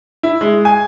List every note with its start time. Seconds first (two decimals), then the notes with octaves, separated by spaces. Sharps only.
0.23 E4
0.41 G#3
0.65 G#5